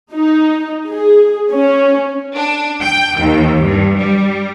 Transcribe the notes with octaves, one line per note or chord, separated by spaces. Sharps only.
D#4
G#4
C#4
D4
G5
D#2
G2
G3